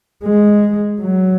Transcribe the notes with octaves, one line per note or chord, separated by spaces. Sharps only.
G#3
F#3